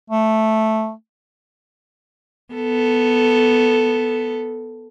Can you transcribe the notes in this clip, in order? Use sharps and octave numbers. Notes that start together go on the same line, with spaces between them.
A3
B3 A4